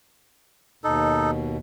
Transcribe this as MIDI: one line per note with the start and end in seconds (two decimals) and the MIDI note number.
0.84 1.57 39
0.84 1.57 47
0.84 1.31 63
0.84 1.31 69